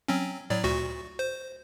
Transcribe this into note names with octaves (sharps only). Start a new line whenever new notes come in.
F#3 C4 C#4
A2 F#3 D5
D2 A#2 F#4
C5